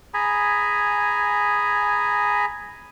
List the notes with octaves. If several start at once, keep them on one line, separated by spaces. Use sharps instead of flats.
G#4 G#5 A#5 B5